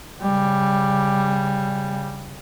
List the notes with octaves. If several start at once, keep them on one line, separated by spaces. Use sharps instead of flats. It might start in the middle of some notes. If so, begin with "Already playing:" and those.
C#3 G3